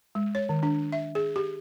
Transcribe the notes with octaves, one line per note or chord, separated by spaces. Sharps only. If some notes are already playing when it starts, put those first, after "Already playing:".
G#3
C#5
D#3
D4
E5
G#4
G4